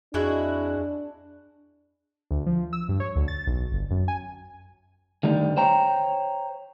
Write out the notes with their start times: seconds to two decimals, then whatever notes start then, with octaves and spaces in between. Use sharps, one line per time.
0.14 F2 G#3 D4 E4 F#4
2.31 D2
2.46 F3
2.73 E6
2.89 G2
3.00 C#5
3.16 D2
3.28 A6
3.47 B1
3.72 G1
3.91 F#2
4.08 G#5
5.23 D3 D#3 G3 A3
5.57 C5 C#5 G5 A#5